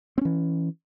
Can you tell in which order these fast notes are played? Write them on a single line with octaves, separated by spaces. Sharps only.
C4 C#4 E3